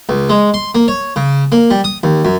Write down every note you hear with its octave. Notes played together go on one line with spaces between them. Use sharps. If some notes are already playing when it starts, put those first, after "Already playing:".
C#2
G#3
C6
A#3
C#5
C#3
A#3
G3
D#6
D#2
F#2